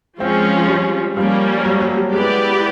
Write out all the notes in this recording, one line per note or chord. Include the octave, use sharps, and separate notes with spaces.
F3 G#3 C4 C#4 F4
G3
F3 G3 A#3 C#4
F#3
F#3
G3
G#3 B3 E4 G4 B4 D5